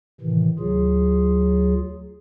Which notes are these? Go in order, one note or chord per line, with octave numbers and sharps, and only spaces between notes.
A2 C3 D#3 E3
D2 F#3 F4 G#4